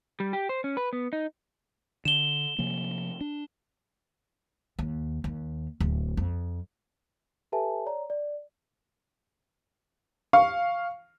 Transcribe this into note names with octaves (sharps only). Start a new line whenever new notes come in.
G3
G4
C5
C#4
B4
B3
D#4
D3 E7 G7
C3 F3 A#3
D4
D#2
D#2
D1
F2
G4 A4 B4 E5 G#5 A5
C#5 D5 A#5
D5
F5 C#6